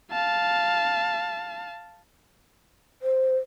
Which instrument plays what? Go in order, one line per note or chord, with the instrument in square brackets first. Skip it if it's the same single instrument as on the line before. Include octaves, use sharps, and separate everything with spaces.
[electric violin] F5 A5
[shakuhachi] C5